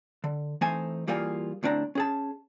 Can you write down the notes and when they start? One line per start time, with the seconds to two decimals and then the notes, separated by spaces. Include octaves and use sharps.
0.24 D3
0.61 E3 A3 C4 D#4 C5 G#5
1.07 E3 G3 A#3 F4 G#4
1.63 D2 A2 C4 D4 A#5
1.95 C#4 G#4 A5